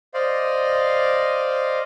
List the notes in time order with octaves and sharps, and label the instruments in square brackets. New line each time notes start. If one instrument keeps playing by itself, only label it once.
[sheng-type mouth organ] C5 D5 D#5 F5